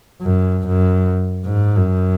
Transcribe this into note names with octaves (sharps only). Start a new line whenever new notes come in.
F#2
F#2
G#2
F#2